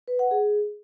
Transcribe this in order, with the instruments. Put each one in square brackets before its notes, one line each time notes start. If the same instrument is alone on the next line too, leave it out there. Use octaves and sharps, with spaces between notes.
[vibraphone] B4
F#5
G#4